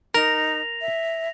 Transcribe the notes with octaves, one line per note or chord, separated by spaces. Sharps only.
D#4 A#4 A#6 F7
E5